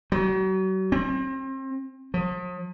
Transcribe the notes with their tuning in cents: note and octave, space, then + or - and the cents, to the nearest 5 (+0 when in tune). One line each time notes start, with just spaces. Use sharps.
F#3 +40
C4 +35
F3 +45